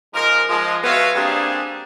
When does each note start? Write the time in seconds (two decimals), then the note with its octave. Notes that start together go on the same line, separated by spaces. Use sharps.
0.14 F3 G#3 D#4 A#4
0.49 F3 G#3
0.84 B3 F#4 B4 C#5 E5 F5
1.15 G3 A#3 C4 D4 G#4